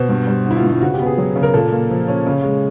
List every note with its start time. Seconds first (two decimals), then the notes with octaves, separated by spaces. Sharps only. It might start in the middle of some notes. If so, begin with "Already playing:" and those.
Already playing: B2 C5
0.09 G2
0.27 G3
0.45 D3
0.51 E4
0.57 F4
0.64 G2
0.70 F4
0.81 C#3 F#4
0.94 G4
1.00 B3
1.06 G#4
1.18 F#3
1.36 C#3
1.43 A#4
1.54 A#2 A4
1.72 A#3
1.90 F3
2.08 C#4
2.27 C#3
2.44 G#3